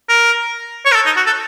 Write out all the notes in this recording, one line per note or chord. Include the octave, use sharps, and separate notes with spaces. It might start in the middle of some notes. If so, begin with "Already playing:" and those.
A#4
C#5
A#4
A4
D#4
F#4
A4